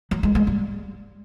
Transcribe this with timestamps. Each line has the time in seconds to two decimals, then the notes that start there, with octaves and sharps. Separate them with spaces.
0.11 F#3
0.23 G#3
0.35 G#3
0.47 G3